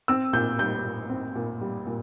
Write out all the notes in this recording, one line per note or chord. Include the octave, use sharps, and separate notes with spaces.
C4 E6
A#2 G6
G3 G6
A#2
C4
A#2
G3
A#2